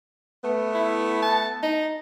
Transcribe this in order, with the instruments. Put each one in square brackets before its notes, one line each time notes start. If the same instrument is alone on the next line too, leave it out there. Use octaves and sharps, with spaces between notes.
[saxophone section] A3 B3
[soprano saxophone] E4
A5
D#4